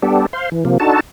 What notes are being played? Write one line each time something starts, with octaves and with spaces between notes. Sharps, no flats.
G3 B3 D4 G4 A4
C5 F5 C6
E3
C3 F3 A#3
D4 D#4 F#4 A4 A5